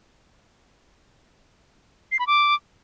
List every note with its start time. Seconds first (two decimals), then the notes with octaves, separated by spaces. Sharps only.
2.11 C7
2.19 B5
2.27 D6